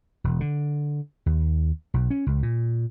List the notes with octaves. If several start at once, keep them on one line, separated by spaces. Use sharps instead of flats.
E1
D3
D#2
B1
C#4
C#2
A#2